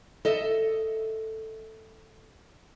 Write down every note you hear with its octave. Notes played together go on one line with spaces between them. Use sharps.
A4 D#5 E5